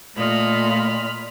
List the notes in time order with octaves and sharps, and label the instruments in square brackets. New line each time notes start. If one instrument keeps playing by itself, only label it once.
[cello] A#2 [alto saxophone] A3 [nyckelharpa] F4 D#5 [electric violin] B5 F6